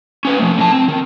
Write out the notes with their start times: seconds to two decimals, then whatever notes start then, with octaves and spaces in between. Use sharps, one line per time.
0.25 C#4 B4
0.39 F3 A3
0.57 A2 A5
0.72 C4
0.88 D#3